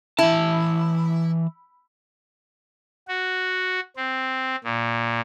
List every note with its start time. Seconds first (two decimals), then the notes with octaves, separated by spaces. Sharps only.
0.19 E3 E4 A5
3.08 F#4
3.96 C4
4.64 A#2